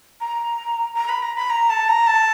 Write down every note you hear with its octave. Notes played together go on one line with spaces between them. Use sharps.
A#5
A#5
B5
A#5
B5
A#5
A5
A#5
A5